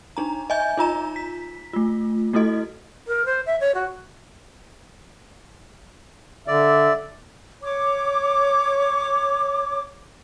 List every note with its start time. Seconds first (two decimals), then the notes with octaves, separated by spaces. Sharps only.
0.17 D4 D#4 A#5
0.50 D#5 E5 G#5 G6
0.77 D#4 F4 A#5 E7
1.16 B6
1.73 A3 F4
2.33 A3 E4 F#4 A4 D#5
3.07 A#4
3.26 C5
3.46 E5
3.60 C#5
3.75 F#4
6.47 D3 D5 E5
7.63 C#5 D6